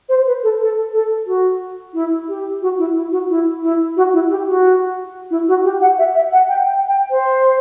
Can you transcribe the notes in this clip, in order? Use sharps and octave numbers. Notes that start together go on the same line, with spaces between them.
C5
B4
A4
A4
A4
F#4
E4
G4
F#4
E4
E4
F#4
E4
E4
F#4
E4
G4
F#4
E4
F#4
G4
F#5
E5
E5
F#5
G5
G5
G5
C5